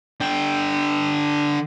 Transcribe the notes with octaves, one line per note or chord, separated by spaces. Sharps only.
D3 G5